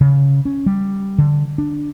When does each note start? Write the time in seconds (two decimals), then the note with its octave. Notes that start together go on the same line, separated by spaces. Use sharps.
0.01 C#3
0.45 C#4
0.66 G3
1.18 D3
1.58 D4